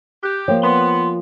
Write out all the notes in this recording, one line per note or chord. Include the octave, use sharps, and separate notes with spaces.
G4 F#6
F3 A#3 C#5 G5
B3 C6